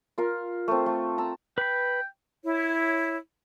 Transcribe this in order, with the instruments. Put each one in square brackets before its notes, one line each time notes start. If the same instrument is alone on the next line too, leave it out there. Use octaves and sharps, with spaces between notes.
[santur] F4 A#4 F5
A3 C4
A3
A5 A#5 E6
[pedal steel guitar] B4 B5 [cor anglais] G5
[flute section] E4 C#5